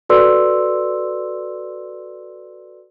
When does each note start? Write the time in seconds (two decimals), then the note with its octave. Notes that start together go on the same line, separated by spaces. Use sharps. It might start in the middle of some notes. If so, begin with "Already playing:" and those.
0.09 F#4 A4 B4 D5 C6 E6